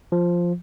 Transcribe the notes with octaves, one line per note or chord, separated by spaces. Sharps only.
F3